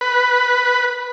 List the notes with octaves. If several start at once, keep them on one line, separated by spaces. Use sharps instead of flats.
B4